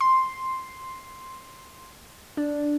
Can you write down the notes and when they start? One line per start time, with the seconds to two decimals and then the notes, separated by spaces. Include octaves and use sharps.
0.01 C6
2.37 D4